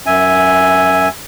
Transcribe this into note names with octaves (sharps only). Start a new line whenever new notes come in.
F#2 E5 G#5